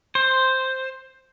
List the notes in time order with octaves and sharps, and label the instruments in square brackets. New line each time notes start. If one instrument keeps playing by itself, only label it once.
[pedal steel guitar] C5